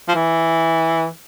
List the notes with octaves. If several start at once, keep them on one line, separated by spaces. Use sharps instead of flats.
F3
E3